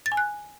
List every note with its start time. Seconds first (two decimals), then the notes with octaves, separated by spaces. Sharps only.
0.06 A6
0.12 G#5
0.17 F#6